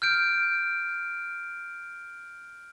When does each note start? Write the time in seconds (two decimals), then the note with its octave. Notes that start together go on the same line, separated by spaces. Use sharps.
0.02 F6 G6 D7